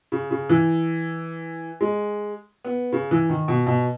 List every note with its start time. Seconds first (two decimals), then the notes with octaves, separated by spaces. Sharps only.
0.12 C#3
0.31 C#3
0.50 E3
1.81 G#3
2.65 B3
2.92 C#3
3.11 E3
3.29 D#3
3.48 B2
3.66 B2